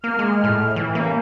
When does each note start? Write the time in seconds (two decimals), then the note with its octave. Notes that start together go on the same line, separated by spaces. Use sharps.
0.04 A#3 F6
0.19 G#3
0.44 A2
0.76 E3
0.95 C3 G3 A#3 C#4